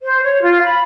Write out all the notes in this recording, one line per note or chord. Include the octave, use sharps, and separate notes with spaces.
C5
C#5
F4
B5